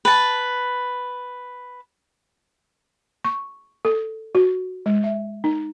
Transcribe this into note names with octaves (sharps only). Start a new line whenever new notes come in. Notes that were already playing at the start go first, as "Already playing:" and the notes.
B4 A5
C#6
A4
F#4
G#3
E5
D#4